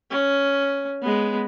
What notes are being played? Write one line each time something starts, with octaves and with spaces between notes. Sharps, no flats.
C#4
G#3 B3